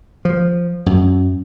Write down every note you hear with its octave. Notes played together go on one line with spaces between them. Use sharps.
F3
F#2